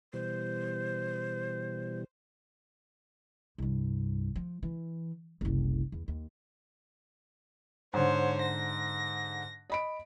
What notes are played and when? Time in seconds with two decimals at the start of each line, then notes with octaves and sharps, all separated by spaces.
0.13 B2 E3 G3 C5
3.58 C2 G2
4.36 F3
4.63 E3
5.41 F#1 C2
5.92 E2
6.08 D#2
7.94 G#2 D3 C5 C#5
8.41 A#6
9.70 D#5 B5 D7